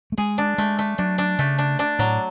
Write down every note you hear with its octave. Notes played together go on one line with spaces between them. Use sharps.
A3
G#3 G#4
D4
G#3 A3
A3
F#3 D4
D4
C#3 A3
D4
D4
A2 F#3